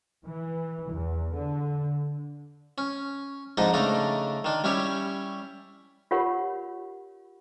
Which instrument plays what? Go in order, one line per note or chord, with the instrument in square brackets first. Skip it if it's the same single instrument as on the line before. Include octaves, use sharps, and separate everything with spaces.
[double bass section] E3
E2
D3
[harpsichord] C#4
F2 G#2 D4 D#4 D#5 D#6
C#3 A3 D4 D#4 A#5
D#3 D4
G3 C#4 E4 G4 C#5
[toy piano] F4 G4 A#4 C#5 F#5 B5